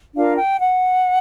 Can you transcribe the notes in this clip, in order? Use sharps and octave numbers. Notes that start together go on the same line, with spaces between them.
D4 F4 A#4 F5
G5
F#5